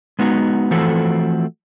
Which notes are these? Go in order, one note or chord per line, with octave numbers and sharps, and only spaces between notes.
G#3 B3 D#4 F#4
E3 F3 A3 C4 F#4 A4